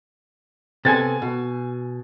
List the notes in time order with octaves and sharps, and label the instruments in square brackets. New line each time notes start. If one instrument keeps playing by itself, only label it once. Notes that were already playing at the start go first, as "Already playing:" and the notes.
[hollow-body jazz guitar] C3 B3 A4 [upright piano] G#5 G#6 A6
[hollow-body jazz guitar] B2